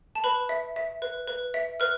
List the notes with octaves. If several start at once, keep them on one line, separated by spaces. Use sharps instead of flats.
A5
B4 B5
E5
E5
B4
B4
E5
B4 F6